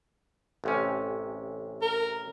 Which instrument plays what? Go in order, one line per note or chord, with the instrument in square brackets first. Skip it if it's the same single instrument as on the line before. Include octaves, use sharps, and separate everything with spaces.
[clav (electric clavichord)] A1 C3 C#4
[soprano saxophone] A#4